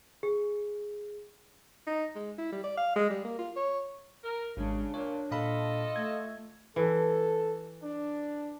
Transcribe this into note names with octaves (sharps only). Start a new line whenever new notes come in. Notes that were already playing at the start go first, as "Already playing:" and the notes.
G#4
D#4
G#3
E4
G3
D5
F5
G#3
G3
A#3
F4
C#5
A#4
G#1 C#3 G#3 D4
A#2 C#5
A#2 F4 A4 D#5 F5 B5
A3 G#6
E3 A4
D4